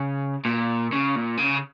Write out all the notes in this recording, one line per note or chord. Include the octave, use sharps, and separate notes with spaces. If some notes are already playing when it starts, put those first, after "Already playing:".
Already playing: C#3
A#2
C#3
A#2
C#3